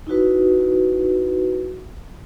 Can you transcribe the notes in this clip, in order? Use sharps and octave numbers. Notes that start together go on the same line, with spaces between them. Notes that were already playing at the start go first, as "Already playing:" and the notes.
D#4 E4 F#4 B4